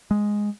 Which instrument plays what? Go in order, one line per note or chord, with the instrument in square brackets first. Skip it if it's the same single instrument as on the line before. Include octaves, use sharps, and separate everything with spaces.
[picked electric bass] G#3